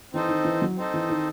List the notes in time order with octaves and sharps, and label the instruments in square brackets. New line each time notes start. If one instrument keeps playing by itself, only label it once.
[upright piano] E3 [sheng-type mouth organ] C4 D#4 A4 C5 D#5
[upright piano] D#3
E3
F#3
[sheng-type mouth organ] C4 D#4 A4 C5 D#5
[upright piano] E3
D#3